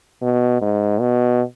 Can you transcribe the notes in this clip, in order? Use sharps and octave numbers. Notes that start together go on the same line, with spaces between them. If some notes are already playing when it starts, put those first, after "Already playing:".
B2
G#2
B2